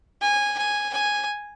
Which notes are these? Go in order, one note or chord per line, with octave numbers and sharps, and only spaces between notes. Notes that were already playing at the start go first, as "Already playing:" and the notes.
G#5
G#5
G#5